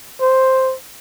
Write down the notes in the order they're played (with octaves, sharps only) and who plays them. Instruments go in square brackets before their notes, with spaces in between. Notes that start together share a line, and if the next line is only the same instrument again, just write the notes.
[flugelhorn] C5